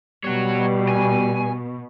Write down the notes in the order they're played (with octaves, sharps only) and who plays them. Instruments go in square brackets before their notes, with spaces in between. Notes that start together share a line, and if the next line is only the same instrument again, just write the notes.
[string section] B2 [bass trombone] G3 [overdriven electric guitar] F#4 C#5
[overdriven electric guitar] G#5